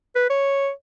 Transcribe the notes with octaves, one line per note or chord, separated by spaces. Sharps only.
B4
C#5